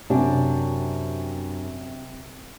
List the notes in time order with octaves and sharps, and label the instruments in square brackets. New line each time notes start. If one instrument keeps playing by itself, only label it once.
[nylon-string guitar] F#2 D4 [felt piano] C3